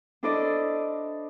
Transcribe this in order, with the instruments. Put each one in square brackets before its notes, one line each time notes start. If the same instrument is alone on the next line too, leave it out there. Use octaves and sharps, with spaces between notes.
[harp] D4 E4 A4 C5 D5 D#5